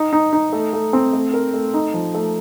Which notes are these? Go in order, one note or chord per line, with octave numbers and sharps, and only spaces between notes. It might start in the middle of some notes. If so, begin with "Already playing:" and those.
Already playing: D#4
D#4
D#4
A3
A3
C4
A3
A#4
A3
D#4
F3
A3